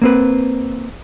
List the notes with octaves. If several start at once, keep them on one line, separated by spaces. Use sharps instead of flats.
A#3 C4 B4